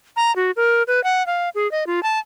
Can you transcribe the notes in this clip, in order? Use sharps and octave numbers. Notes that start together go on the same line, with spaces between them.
A#5
F#4
A#4
B4
F#5
F5
G#4
D#5
F4
A5